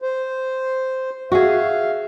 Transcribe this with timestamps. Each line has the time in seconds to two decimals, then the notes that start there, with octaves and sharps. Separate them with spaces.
0.02 C5
1.32 F#4 G#4 E5 F5